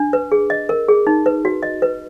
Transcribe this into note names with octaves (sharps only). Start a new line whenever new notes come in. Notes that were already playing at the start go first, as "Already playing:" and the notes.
Already playing: D4
B4
G#4
D#5
A#4
G#4
D#4
B4
F#4
D#5
B4